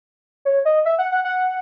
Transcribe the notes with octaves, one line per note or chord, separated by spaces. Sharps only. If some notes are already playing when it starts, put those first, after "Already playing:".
C#5
D#5
E5
F#5
F#5
F#5